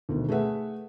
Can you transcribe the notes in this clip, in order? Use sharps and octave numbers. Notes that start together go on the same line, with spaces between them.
D2 B2 D#3
A3 G#4 B4 E5 F#5